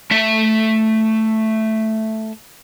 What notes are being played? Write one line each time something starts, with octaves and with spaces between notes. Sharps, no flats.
A3 E5